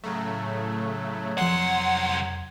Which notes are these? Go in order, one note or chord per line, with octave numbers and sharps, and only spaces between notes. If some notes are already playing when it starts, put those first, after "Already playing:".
A2 C#3 F#3 A3
C2 F2 F#5 C6 G#6